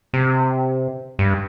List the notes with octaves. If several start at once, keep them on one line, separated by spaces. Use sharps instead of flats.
C3
G2